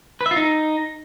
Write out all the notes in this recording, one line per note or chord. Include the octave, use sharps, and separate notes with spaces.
B4
E5
F4
D#4